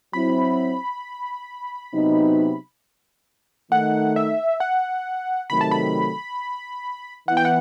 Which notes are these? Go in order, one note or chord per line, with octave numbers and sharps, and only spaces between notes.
F#3 C4 E4 B5
C3 F#3 B3 D#4
D#3 A3 D#4 F#5
E5
F#5
C3 D#3 F#3 A3 B5
A5
B5
E3 B3 F#5
G5
F#5